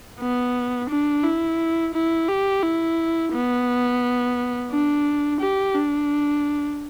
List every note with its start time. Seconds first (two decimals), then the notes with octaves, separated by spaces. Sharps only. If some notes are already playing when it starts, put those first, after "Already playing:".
0.20 B3
0.90 D4
1.24 E4
1.94 E4
2.28 G4
2.62 E4
3.33 B3
4.71 D4
5.40 G4
5.74 D4